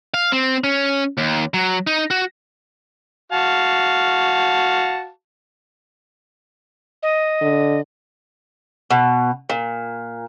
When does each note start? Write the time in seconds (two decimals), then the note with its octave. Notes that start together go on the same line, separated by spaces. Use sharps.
0.14 F5
0.32 C4
0.64 C#4
1.17 D#2
1.54 F#3
1.87 D#4
2.11 F#4
3.32 F#4 F5 A5
7.03 D#5
7.41 D3
8.91 B2
9.49 A#2